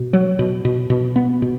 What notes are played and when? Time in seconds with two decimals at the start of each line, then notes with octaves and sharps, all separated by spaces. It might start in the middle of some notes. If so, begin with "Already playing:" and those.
Already playing: B2
0.13 F#3
0.39 B2
0.65 B2
0.90 B2
1.16 B3
1.42 B2